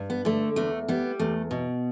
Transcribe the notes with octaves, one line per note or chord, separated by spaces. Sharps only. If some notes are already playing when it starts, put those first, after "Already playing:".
Already playing: G2
B3
D3 A3
E2 A3
G3 B3
E2 A3
B2